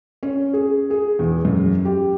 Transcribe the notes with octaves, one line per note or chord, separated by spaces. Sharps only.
C#4
G#4
G#4
E2
F#2
G4